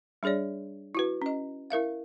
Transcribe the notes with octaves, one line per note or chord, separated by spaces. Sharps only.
G3 D4 G#4 C#5 D5
E4 F#4 B4
C#4 D#5
E4 A#4 E5 F5